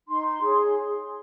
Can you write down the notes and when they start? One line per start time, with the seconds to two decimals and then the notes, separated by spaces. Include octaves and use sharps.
0.09 D#4 C6
0.42 G#4 C#5